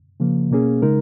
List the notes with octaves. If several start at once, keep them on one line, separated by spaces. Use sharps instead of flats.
C#3 F3 A#3
B2 A#3 C#4 G#4
C#3 G#3 D#4 A#4